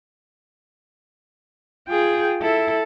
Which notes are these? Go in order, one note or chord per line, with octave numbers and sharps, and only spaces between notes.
F4 G#4 G5
E4 A4